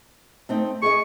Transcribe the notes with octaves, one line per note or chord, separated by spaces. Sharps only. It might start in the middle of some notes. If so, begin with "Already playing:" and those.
A3 C4 D#4
G#4 D5 D#5 C#6